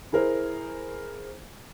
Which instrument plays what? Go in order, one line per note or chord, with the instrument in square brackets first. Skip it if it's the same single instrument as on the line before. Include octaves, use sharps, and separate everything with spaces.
[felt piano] E4 G#4 A#4 C5